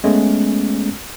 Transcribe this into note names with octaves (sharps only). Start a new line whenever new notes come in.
G#3 A3 B3 C#4